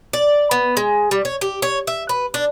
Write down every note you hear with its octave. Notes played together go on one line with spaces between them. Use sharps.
D5
B3
G#3
G3
C#5
G4
C#5
E5
B4
D4